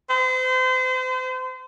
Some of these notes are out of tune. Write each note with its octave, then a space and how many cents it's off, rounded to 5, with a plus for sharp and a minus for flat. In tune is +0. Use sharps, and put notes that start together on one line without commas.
C5 -35